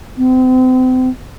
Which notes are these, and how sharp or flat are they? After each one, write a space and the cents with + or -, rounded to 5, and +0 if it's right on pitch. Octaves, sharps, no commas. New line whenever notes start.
C4 -35